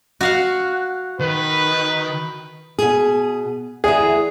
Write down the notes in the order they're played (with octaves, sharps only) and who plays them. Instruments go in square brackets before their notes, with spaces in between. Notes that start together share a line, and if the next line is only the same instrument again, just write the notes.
[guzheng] F#4 F5 F#5
[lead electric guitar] D#3 [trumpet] B4
[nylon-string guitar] B2 G#4
[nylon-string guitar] D2 E3 [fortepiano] G#4